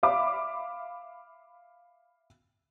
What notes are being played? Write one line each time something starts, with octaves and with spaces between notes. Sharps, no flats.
E5 F5 B5 D6